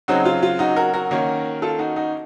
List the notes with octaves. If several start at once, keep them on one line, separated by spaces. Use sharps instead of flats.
C#3 F#3 C4 D#4 F#4
F4
F4
D#4 F#4
F#4 A#4
F#4 A#4
D#3 A#3 C#4
F4 A4
D#4 F#4
D#4 F#4